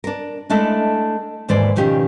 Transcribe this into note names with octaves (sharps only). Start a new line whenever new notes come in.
D4 A#4
G#3 A3 D4 E4 A4 D#5
D#2 G#2 E3 C5 D5
B2 D#3 F3 C#4 G4